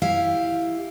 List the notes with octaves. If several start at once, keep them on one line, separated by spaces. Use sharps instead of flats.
E4 G4 F5